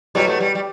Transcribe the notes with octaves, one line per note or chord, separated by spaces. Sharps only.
E2 B2 F#3 G3
A3
G3
G3